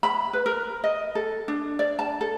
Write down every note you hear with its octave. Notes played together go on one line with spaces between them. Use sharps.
B5
B4
A#4
D#5
A4
D4
D5
A5
A4